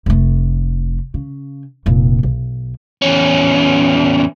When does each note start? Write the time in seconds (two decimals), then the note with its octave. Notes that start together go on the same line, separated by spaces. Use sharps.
0.06 F1 A3
1.14 C#3
1.86 F1 A#2
2.23 B1
3.02 E2 C#4